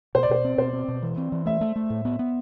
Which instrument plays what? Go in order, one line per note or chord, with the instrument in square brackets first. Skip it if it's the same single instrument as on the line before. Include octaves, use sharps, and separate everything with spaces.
[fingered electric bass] B2 [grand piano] C5
[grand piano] D5
[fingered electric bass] B2 [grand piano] C5
[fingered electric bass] C4
[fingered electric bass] B2 [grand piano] C5
[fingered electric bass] C4
B2
E3
C4
E3
[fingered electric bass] A3 [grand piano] E5
[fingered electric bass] A3
A3
A2
B3
B3